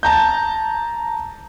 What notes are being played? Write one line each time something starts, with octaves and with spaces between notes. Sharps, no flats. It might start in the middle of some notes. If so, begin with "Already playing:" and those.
A5 A#5 G6